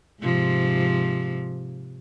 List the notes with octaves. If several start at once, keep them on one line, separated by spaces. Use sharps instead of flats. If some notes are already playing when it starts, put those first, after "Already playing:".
G#2 C3 F3